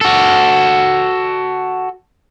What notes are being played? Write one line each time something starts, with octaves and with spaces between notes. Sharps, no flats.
F#4 A4